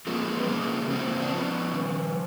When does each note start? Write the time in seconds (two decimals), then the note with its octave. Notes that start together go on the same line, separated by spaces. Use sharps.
0.07 F3 G#3 A#3
0.40 B3
0.48 C#3 G#3 A#3
0.90 C#3 A#3 C4
1.22 D4
1.31 F3 B3 C#4
1.73 D#3